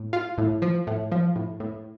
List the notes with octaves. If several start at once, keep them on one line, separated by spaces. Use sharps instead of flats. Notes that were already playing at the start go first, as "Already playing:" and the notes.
Already playing: A2
F4
A2
F3
A2
F3
A2
A2